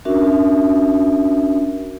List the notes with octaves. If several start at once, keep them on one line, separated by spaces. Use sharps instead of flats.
C#4 D4 F#4 A#4 E5